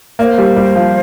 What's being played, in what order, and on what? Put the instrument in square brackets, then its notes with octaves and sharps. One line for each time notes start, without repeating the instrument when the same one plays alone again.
[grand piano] A#3 [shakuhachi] D5
[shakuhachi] C5
[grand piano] G3 G4
G3 G4
F3 F4